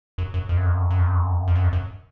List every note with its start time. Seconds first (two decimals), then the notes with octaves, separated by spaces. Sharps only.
0.18 F#2
0.34 F#2
0.49 F2
0.57 F#2
0.66 F2
0.74 F#2
0.82 F2
0.90 F#2
0.99 F2
1.07 F#2
1.15 F2
1.23 F#2
1.31 F2
1.40 F#2
1.48 F2
1.56 F#2
1.64 F2
1.73 F#2